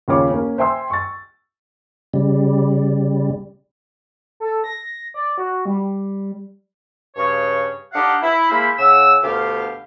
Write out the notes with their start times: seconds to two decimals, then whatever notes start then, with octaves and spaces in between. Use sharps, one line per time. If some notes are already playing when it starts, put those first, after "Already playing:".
0.08 D#2 C#3 C#4 F4 C#5 D6
0.31 A#3 C#4
0.58 C5 E5 G5 G#5 C6 E6
0.90 C#6 A6
2.14 C#3 G3
4.40 A4
4.64 A#6
5.14 D5
5.38 F#4
5.65 G3
7.15 G2 C#3 C#5
7.93 D4 D#4 G4 F5 F#5
8.22 E4
8.50 G#3 A#3 E4 C5 B5
8.79 C#3 F#5 E6
9.23 D2 B2 G4 F5